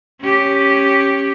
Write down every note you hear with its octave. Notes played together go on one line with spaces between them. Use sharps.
C#4 G4